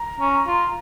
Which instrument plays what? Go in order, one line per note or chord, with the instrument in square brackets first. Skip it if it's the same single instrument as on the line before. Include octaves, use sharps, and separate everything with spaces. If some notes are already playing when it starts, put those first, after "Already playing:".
Already playing: [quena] A#5
[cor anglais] C#4
F4